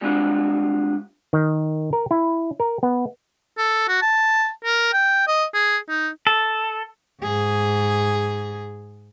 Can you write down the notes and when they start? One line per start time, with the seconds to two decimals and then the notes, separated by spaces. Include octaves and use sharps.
0.01 G3 G#3 C4 D4 F4 F#4
1.33 D#3
1.93 A#4
2.11 E4
2.60 A#4
2.83 B3
3.58 A4
3.89 F#4
4.02 A5
4.65 A#4
4.93 G5
5.28 D#5
5.54 G#4
5.89 D#4
6.27 A4
7.22 G#2 G#4